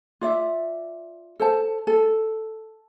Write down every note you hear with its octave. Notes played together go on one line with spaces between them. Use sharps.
F4 D5 E5
A4 C5 A5
A4